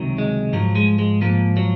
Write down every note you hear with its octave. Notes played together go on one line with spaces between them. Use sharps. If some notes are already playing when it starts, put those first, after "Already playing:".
Already playing: C#2 C3 D#3 F#3
G#3
G#2 F3 F#3
G#3
G#3
G#2 F3 A#3
F#3